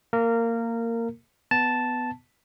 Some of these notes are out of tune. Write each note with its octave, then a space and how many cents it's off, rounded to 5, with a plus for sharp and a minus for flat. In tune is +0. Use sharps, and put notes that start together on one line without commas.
A#3 -15 A#4 -20
B3 +10 A5 -5